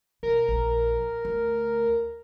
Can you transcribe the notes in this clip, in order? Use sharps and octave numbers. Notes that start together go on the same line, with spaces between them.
B2 A#4
A#1
D2